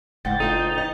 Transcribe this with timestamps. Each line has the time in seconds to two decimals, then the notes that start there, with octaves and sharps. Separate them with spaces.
0.25 F#1 G#2 F#5 G5 A6
0.40 D4 D#4 F4 A4
0.75 E2 D#5